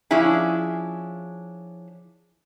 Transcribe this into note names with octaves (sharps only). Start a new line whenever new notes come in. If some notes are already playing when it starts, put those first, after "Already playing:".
F3 C#4 D4 E4 G#4